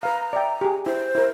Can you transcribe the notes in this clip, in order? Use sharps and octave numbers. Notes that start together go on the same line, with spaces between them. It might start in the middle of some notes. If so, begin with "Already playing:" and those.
B4 F5 A#5
D5 E5 G5
G4 G#4
E4 C5
E4 A#4